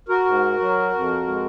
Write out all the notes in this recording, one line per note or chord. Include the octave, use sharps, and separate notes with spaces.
F#4 A#4
G#2
F#3
F2
G#3